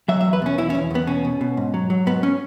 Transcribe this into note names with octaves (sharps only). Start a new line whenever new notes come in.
F#3 E5
E5
E2
B4
B2 C#4
E2 E4
C#4
E2
E2 B3
B2 C#4
B2
B2
G#2
F#3
F#3
G#2 B3
C#4